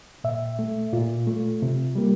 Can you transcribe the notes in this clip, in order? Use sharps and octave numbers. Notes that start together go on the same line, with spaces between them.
A#2 E5
A3
A#2 F4
A3
C3
G3 A#3